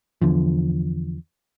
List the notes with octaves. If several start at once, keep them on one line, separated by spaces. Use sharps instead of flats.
E2 D3 F3